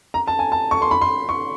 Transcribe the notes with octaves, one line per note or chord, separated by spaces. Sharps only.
A#5
A5
G#5
A5
C#6
C6
B5
C6
C#6